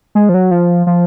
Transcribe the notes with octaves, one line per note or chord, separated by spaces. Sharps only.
G#3
F3
F#3
F3
F3